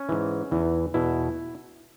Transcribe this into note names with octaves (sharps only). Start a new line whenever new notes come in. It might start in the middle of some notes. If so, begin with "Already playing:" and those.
Already playing: C#4
G#2 E3
E2 E3
E2 B2 E4